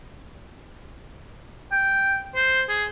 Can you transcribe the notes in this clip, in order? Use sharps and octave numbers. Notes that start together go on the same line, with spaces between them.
G5
C5
G#4